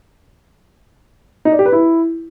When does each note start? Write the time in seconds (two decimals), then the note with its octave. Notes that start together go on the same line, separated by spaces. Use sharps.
1.45 D#4
1.52 D5
1.59 G4
1.66 B4
1.72 E4